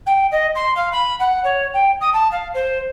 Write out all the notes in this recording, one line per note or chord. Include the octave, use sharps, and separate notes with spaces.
G5
D#5
C6
F5
B5
F#5
C#5
G5
D#6
A5
F5
C5